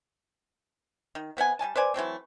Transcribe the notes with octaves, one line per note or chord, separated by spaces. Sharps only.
D#3
C3 B3 F#5 G#5
G3 G#3 G#5 A5
B4 C5 D5 G#5
E3 F#3 A3 C4